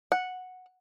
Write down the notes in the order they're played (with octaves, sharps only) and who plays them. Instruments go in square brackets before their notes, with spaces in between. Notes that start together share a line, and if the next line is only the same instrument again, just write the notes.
[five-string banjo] F#5